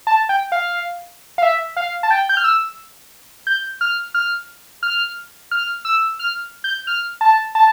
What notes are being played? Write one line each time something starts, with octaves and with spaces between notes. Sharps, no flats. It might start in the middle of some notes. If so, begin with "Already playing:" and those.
A5
G5
F5
F5
E5
F5
A5
G5
G6
F6
E6
G6
F6
F6
F6
F6
E6
F6
G6
F6
A5
A5